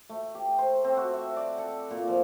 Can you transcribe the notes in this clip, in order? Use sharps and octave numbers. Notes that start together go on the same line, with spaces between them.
A3
G4
C5
C4
F#4
E5
D5
A4
A#2
F3